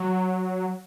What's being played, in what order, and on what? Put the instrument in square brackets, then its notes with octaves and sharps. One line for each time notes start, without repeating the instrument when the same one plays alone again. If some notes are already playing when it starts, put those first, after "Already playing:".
Already playing: [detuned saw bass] F#3